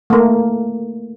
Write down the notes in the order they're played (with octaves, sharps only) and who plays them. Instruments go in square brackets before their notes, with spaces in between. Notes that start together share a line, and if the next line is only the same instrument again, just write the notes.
[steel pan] A3 A#3